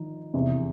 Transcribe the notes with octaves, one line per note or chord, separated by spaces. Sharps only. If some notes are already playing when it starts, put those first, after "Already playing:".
Already playing: G#1 F3 D#4
F1 E2 C3 E3